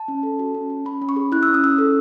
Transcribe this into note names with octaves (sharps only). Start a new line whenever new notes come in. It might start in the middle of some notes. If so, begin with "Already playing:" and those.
Already playing: A5
C#4
A4
F#4
C#4
C#4
C#4 B5
C#4
C#6
G#4
E4 F#6
E6
C#4
D#6
C#4 E6
A4